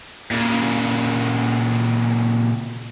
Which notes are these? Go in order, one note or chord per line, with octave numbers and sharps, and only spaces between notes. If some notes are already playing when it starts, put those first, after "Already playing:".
A#2 C#3